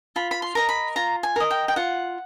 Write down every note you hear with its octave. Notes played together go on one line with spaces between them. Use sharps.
F4 B5
B5
C6
A#4 D#5 A#5
B5
F4 A#5
G#5
A#4 D#5
G5
G5
F4 F#5